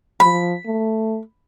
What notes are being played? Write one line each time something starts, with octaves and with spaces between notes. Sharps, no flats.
F3 B5
A3